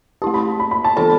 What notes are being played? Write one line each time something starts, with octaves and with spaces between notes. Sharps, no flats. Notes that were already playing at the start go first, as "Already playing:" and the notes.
A3 E4 G4 A5
B5
B5
B5
A5
E3 B3 F4 A4 D5 A5